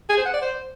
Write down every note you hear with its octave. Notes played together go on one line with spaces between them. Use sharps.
G#4
C5
F#5
D5
C5